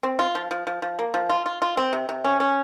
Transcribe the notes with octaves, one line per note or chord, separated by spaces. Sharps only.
C4
F4
F3
F3
F3
F3
A#3
F3
F4
F4
F4
C4
C3
C3
C#4
C#4